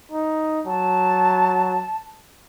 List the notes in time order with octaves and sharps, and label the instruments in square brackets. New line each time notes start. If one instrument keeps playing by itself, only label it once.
[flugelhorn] D#4
[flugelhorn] F#3 [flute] A5